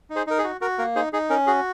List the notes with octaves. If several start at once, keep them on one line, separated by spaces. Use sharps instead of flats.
D#4
G#4 C5
D#4 A#4
G#4
F#4
F#4 A#4
A#3 A#4
D#4 G#4 C5
D#4 G#4
C#4 A#4
F#4 G#4